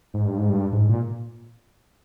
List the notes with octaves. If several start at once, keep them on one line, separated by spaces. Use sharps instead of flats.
G#2
G2
G#2
G2
G#2
A#2